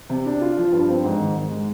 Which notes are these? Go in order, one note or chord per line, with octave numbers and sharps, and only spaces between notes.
C3
D4
F4
F3
G2
C4
G#2
D#3
G#2
G#3